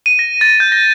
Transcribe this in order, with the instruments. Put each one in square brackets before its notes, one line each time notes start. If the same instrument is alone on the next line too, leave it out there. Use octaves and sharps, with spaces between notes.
[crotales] D#7
A#6
A6
G6
A#6